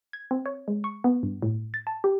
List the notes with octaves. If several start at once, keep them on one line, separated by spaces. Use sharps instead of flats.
G#6
C4
C#5
G#3
C#6
B3
G2
A2
A6
A5
G4